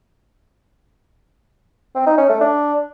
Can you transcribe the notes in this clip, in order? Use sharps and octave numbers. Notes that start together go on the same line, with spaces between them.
C4
D#4
C#4
A3
D4